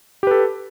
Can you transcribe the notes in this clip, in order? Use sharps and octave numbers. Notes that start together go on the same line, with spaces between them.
G4 A4 B4